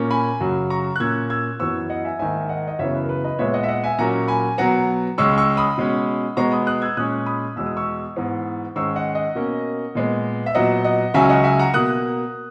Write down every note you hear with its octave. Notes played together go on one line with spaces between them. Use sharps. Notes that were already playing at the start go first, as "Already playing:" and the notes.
Already playing: A#2 A#3 C#4
G#5 B5
F#2 C#3 F#3
A#5 C#6
F#6
A#2 A#3 C#4 E6 G#6
E6 G#6
F#2 E3 B3 C#6 E6
D#5 F#5
E5 G#5
G#2 D#3 A#3 E5 G#5
D#5 F#5
D#5
F#2 C#3 E3 B3 C#5 E5
B4
A#4
B4
B4 D#5
A#2 G#3 B3 C#5 E5
D#5 F#5
E5
D#5 F#5
E5 G#5
A#2 F#3 A#3 C#4 F#5 A#5
G#5 B5
B2 F#3 B3 F#5 A#5
C#2 C#3 G#3 C#4 C#6 E6
C#6 E6
B5 D#6
B2 G#3 C#4
B2 G#3 B3 A#5 C#6
B5 D#6
D#6 F#6
E6 G#6
A#2 G#3 C#4 D#6 F#6
B5 D#6
E2 B2 G#3 E6
D#6
C#6 E6
G#2 E3 B3
G#2 D#3 G#3 C#4 C#6 E6
D#5 F#5
D#5 F#5
B2 A#3 C#4
A#2 G#3 B3
E5
A#2 F#3 B3 D#5 F#5
D#5 F#5
C#2 C#3 F#3 C#4 E5 G#5
D#5 F#5
E5 G#5
F#5 A#5
B2 A#3 D#6 F#6